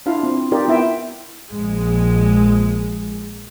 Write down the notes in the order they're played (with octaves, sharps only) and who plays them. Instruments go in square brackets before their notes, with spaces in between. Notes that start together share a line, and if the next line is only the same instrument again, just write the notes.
[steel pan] D4 E4 F4 F5
C4
D#4 F4 G4 A#4 D5
B3 E4 E5 G5
[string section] A#1 G#3